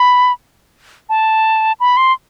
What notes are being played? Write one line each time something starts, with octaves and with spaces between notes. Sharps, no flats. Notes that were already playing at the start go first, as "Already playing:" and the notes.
Already playing: B5
A5
B5
C6